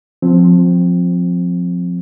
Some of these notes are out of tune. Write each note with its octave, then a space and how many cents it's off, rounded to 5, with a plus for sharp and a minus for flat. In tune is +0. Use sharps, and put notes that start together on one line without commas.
F3 +20 C4 +0